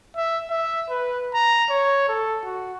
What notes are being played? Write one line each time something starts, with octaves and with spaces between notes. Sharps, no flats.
E5
E5
B4
A#5
C#5
A4
F#4